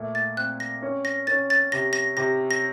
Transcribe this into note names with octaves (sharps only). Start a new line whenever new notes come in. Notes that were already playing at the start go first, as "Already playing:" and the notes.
Already playing: A#2 A3
A6
C4 F#6
A#6
C#4
A#6
C#4 A6
A6
C3 A#6
A#6
C3 A#6
A#6